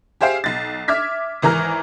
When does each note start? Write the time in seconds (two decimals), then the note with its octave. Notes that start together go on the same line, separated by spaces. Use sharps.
0.21 G4 G#4 C5 E5 F5 G5
0.44 B1 A6
0.88 E5 D6 F6 G#6 B6
1.42 G#1 E3 A#4 A#5 F6